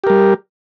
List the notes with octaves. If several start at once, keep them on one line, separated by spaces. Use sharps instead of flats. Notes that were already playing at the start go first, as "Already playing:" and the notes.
G3 G4 A#4